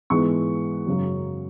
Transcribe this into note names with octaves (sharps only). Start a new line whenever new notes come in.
G#2 E3 G#3 B3 C#6
F#2 C#3 F#3